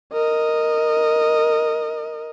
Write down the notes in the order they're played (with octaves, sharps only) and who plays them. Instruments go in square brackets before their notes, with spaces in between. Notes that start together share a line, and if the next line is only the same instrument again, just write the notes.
[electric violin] A#4 D#5